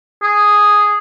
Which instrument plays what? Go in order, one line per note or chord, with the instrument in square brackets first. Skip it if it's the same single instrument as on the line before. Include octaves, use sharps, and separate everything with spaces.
[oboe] G#4